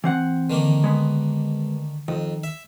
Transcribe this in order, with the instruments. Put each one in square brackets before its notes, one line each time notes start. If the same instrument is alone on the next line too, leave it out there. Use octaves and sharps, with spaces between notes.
[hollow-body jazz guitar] E3 C4 F#5
[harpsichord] D3 D#3 A#3
[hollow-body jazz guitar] G#3 B3
[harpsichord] F2 [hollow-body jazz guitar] D#3
[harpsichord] E5